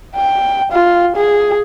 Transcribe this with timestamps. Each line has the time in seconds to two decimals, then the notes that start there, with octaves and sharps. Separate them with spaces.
0.15 G5
0.72 F4
1.16 G#4